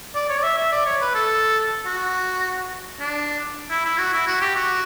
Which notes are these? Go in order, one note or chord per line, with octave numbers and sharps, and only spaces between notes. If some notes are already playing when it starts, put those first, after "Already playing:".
D5
C#5
D5
E5
E5
D5
C#5
B4
A4
F#4
D4
E4
E4
F#4
E4
F#4
G4
F#4